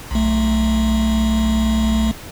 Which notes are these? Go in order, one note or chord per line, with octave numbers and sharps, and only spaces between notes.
B1 A3